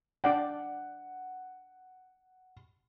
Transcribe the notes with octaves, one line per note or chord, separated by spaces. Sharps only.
D4 D5 F#5 G5